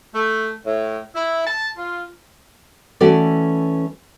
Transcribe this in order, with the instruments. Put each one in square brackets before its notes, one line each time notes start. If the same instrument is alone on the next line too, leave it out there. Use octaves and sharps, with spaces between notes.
[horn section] A3
A2
E4
A5
F4
[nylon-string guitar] E3 A3 C#4 F#4 A4 D5